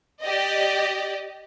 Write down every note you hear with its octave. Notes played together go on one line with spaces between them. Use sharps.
G4 D5 D#5